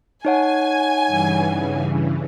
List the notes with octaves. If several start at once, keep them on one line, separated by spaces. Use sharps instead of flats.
D#4 C#5 F#5 G#5
G2 C#3 E3